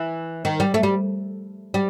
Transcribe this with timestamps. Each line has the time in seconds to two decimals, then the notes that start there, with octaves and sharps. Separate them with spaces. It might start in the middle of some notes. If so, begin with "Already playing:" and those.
Already playing: E3
0.45 D#3
0.60 G3
0.74 A3
0.83 G3
1.74 G3